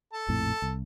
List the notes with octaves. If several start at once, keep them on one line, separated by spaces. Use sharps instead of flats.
A4 A5
A#1 F2 A2
C2